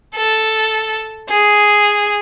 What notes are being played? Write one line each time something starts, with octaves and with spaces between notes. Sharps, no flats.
A4
G#4